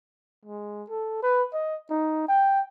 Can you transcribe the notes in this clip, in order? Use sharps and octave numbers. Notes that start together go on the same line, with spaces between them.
G#3
A4
B4
D#5
D#4
G5